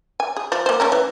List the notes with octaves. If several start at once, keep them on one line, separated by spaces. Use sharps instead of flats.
G#5
G#4
F3 F4
A#3 C5
A3 C#4 A#4
E3